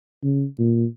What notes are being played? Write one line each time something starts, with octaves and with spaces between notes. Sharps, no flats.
C#3
A#2